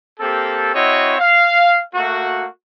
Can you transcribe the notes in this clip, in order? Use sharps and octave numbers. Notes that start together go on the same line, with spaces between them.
A#3 C4 G4 A4
C4 E4 F#4 C#5 D#5
F5
A3 A#3 F#4